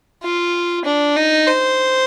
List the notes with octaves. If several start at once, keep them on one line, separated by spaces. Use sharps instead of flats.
F4
D4
D#4
C5